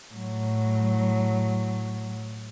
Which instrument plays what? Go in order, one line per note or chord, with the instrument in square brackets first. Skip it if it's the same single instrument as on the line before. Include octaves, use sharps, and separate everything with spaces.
[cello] A2 F#3